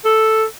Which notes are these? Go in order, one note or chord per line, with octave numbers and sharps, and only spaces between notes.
A4